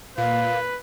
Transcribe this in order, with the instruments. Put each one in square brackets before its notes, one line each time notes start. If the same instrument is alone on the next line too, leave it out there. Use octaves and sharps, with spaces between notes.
[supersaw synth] A#2 [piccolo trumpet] B4 [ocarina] F5